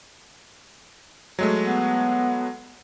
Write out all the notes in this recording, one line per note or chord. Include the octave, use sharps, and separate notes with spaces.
F#3 G#3 A3
B3